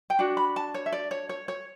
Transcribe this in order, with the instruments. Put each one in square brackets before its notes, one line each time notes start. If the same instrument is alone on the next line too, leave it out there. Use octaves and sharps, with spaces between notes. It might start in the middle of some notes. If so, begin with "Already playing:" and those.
[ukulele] G5
D4 F#4
B5
A5
C#5
E5
D5
C#5
C#5
C#5